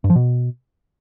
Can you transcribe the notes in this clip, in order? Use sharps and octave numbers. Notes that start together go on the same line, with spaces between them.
G2
F3
B2